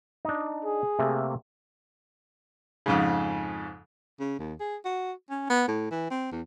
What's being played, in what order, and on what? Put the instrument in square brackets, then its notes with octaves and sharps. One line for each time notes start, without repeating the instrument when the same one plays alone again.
[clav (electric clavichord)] D4 D#4
[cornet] G#4
[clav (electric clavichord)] C3 A3 A#3
[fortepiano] F2 G#2 C#3
[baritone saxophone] C#3
D#2
G#4
F#4
C#4
B3
A2
E3
C4
E2